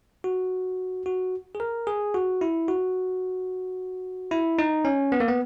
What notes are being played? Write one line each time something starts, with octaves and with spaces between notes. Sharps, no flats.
F#4
F#4
G#4
A#4
G#4
F#4
E4
F#4
E4
D#4
C#4
B3
A#3
B3